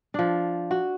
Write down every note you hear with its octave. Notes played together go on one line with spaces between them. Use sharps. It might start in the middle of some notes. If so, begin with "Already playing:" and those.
F3 D4
F#4